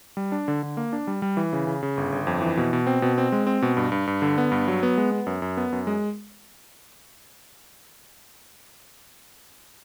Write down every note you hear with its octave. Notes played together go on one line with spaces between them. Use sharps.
G3
D4
D3
D3
A#3
D4
G3
G3
E3
C#3
C#3
C#3
G1
G1
F2
E3
B2
B2
C4
B2
C4
G#3
C4
B2
G2
G2
G2
D3
B3
G2
F#3
B3
G#3
B3
F#2
F#2
B3
F#2
G#3